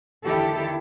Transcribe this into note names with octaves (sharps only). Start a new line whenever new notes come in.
E2 D3 D#3 E4 G4 A4